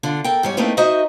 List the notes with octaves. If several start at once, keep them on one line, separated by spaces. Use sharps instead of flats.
D3 D4 F4
A4 A#4 G5
G#2 G3 C#5
A3 A#3 C4 D#4 E4 B4
D#4 F#4 C5 D#5 E5